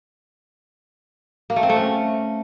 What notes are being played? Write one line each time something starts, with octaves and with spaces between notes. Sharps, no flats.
A#3
A3
C4
A3
C#4